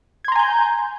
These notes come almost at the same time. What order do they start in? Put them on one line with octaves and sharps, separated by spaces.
G#6 C6 A#5 G#5 G6